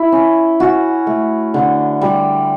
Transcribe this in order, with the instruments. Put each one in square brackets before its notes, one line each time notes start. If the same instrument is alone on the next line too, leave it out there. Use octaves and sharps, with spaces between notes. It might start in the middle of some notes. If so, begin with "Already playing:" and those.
Already playing: [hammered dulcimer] E4
C#4
C#4 F#4
A3
D3
G3